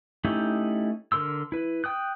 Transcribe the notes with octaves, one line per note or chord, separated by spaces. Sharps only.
A3 C#4 D#4 E4 G4
D3 A#4 C6 E6
E4 B4
G5 D#6 F#6